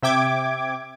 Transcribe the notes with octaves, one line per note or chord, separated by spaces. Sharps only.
C3 E5 G5 D6 G#6